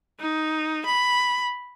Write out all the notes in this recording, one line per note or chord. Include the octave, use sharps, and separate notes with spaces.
D#4
B5